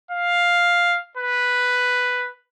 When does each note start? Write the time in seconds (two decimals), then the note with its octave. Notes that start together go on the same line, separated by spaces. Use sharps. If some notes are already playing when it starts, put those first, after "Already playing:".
0.11 F5
1.17 B4